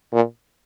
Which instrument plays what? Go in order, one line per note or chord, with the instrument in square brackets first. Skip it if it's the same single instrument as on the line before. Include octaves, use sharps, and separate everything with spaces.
[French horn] A#2